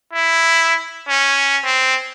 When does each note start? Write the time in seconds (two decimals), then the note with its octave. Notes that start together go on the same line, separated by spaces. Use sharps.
0.14 E4
1.09 C#4
1.65 C4